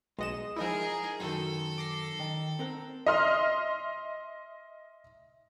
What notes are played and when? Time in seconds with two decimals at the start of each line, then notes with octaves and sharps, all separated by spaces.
0.19 B1 G#3 D#5 F#5 E7
0.56 F3 D#4 E4 G#4 A#4
1.20 F#2 D#3 A4
1.78 D6 A#6 C7
2.19 D#3
2.59 C4 A#4 F#5
3.06 D#5 E5 C6 F6